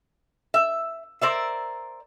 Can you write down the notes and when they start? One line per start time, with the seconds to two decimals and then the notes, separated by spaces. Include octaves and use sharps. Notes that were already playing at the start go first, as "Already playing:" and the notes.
0.54 E5
1.21 A#4 C5 D5 E5